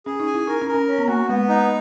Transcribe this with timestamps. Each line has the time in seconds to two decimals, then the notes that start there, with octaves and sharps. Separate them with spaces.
0.06 C#4 G#4
0.20 D#4
0.26 G#5
0.34 E4
0.48 D#4 A#4
0.62 C#4
0.68 A#4
0.74 C#4
0.87 C#4
0.98 B3
1.08 A#3 F#4
1.29 G#3 B3
1.49 D#4